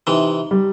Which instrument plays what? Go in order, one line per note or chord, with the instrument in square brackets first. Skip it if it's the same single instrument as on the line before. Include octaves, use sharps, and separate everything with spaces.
[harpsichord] C3 E3 [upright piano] D#4
[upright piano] G3